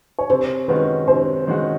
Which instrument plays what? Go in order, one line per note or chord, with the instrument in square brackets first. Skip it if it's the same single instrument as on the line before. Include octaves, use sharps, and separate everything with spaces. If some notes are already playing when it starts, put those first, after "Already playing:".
[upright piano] C#5
[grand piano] C3 [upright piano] C5
[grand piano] D#3 G#3 C#4 F#4 [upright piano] B4
[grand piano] C3 [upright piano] C5
[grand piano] D#3 G#3 C#4 F#4